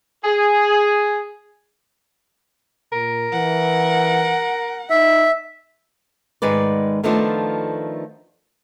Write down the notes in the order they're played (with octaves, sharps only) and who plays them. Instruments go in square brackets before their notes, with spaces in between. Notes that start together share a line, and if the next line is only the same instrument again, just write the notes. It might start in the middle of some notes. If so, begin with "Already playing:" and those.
[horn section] G#4
[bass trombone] A#2 [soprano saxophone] A#4
[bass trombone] E3 [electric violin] F#5
[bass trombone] D#4 [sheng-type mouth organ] E5
[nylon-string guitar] G#2 D#3 G#3 B4 D5
D#3 F3 A3 B3 D4 F4